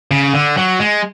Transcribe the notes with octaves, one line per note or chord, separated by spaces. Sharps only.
C#3
D3
F#3
G#3